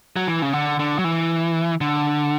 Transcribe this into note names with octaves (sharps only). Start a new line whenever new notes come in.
F#3
E3
C#3
D3
D3
F#3
E3
D3